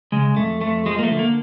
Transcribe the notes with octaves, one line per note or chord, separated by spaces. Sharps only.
C#3 G#3
F2 A3
F2 A3
F3 G#3
A#3
A3
D3
A#3